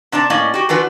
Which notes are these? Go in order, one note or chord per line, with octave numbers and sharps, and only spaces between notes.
C3 D4 D5 A5
A2 A#3 C#4 D5 D#5
F#4 G4
E3 D4 F4 F#4 B4